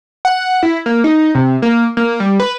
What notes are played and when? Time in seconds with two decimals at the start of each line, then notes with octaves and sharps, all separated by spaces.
0.25 F#5
0.63 E4
0.86 A#3
1.04 D#4
1.35 C3
1.62 A#3
1.97 A#3
2.20 G3
2.40 B4